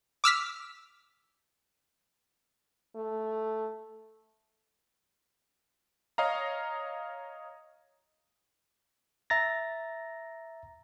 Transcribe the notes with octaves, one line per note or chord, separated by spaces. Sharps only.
D6 E6 F6 B6
A3
C#5 D#5 F5 A#5
E5 A#5 A6 A#6